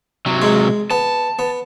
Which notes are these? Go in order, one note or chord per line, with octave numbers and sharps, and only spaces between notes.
C3 F#3
G#3
B3 A5
B3